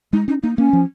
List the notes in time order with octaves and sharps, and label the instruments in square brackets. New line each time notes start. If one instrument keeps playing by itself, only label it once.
[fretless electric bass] G#3 [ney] D#4
[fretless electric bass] C#4 [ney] D#4
[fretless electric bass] A#3 [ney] D#4
[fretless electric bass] A#3 [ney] C#4
[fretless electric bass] F3